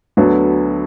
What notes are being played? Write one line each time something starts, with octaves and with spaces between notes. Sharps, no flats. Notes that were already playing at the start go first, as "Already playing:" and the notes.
D2 D3 F#3 B3